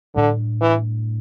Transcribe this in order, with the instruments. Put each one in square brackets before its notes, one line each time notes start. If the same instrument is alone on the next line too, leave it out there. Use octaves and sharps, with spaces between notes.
[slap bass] A2 G3 D4 [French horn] D3
[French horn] E3